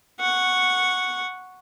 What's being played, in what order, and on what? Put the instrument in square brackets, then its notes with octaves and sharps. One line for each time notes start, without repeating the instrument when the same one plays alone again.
[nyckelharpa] F#5 C#6